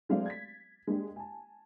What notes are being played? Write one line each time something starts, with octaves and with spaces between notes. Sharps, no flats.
F#3 G#3 A3 C4 D5 F5
G#6 A6 B6
G#3 A#3 D4 G4
G#5 A5